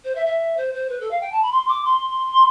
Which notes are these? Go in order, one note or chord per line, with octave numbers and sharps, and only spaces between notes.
C5
E5
E5
C5
C5
B4
A4
F5
G5
A5
B5
C6
D6
C6